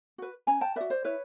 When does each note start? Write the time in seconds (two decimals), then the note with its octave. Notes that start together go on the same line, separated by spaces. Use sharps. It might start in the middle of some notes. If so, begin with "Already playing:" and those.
0.18 F#4 B4
0.47 C#4 G#5 A#5
0.61 G5 A5
0.76 F#4 B4 D5 E5
0.90 C5 D5
1.05 E4 B4 C#5